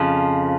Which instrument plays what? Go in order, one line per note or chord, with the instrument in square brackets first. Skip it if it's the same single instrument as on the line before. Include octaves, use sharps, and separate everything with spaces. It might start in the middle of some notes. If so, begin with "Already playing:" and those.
Already playing: [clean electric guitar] F2 C#3 F3